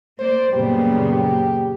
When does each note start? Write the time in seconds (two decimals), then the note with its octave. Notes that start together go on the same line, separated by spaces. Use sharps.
0.19 A#3 C5 D5
0.52 F#2 A#2 C#3 G3 A#3 B3
1.09 G4